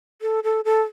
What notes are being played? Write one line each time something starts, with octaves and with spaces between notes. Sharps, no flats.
A4
A4
A4